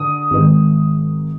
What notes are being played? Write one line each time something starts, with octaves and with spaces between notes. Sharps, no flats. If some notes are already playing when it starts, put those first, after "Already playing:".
Already playing: D3 D#6
G#1 G#2 D#3 G#3